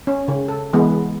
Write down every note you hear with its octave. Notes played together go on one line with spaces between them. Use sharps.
C#4
C#3
A4
E3 G#3 B3